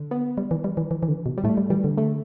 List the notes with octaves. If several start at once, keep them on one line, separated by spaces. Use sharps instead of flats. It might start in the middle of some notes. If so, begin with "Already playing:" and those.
Already playing: D3
B3
G3
E3
G3
E3
E3
E3
D3
B2
G3
A2 A3
G3
E3 G3
D3
A3